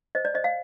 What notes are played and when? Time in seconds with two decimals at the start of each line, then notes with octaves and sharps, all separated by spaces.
0.15 C5 D#5
0.25 D5
0.34 C5 D#5
0.44 F5